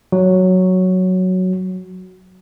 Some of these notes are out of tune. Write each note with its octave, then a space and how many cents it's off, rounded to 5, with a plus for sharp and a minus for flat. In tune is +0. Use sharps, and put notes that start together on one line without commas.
F#3 +0 F#4 +0